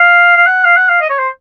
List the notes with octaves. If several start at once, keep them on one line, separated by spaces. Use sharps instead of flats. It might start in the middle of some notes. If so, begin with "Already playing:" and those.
Already playing: F5
F5
F#5
F5
F#5
F5
D#5
C#5
C5